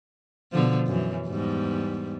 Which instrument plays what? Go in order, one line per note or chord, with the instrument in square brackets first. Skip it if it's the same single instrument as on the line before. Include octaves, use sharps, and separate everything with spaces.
[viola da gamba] B2 D3 F3
F#2 E3
E2 G#2 G3